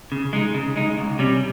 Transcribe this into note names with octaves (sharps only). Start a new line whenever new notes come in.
C#3
G#3 D#4
C#3
G#3 D#4
C#2
C3 G3 C#4